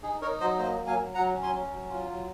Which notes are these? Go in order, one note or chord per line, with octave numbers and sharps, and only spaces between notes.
D#4 G#4
D#4 A#4 C#5
F#3 C5 D#5
A#3 C5 D#5
F#3
F5 G#5
F#3
F#3 F#5 A#5
C#4
G#5 C6
C#4
F#3
F4
F#3